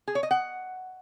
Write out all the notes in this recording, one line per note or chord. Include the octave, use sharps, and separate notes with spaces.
G#4
C#5
D#5
F#5